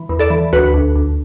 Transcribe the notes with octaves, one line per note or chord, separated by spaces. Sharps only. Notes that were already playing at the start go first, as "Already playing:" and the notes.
Already playing: E3
E2
A4 D5
E3
D2 F#4 B4
D2
D2